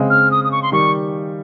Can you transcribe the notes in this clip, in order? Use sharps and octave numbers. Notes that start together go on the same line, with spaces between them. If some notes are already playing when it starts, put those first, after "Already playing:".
Already playing: C#3 G#3 C4
F6
D#6
D#6
C#6
C6
D#3 G3 C#6